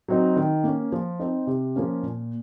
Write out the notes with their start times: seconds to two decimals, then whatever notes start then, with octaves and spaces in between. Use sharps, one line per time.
0.08 F#3 C4 D#4
0.36 D#3
0.64 A#3 C#4
0.92 F3
1.19 C4 D#4
1.47 C3
1.76 F3 A#3 C#4
2.03 A#2